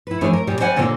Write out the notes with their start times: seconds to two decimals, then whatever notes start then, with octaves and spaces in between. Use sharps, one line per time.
0.07 E4 B4
0.21 F2 E3 A3 D4 G#4 C#5
0.33 A#4
0.47 A#2 G3 G#4
0.60 G3 C5 D5 D#5 F#5 G#5
0.76 A#2 D3 F#3 A#3 C4 F4